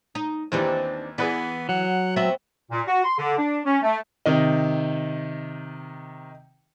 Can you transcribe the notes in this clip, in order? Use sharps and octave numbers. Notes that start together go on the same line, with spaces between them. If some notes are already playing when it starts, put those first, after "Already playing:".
D#4
D#2 E3 C4 D4 D#4 G4
E3 B3 G#4 B4 D5
F#3 F#5
B3 C4 F#4 E5
A#2
F#4
C6
D3
D4
C#4
A3
C3 D#3 D#4